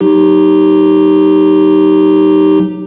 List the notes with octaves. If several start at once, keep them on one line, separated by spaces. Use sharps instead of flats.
F#3 D#4 G4